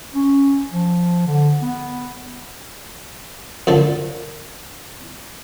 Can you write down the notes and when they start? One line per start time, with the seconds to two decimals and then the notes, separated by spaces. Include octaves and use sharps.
0.14 C#4
0.72 F3
1.26 D3
1.62 B3
3.67 F#2 D3 F3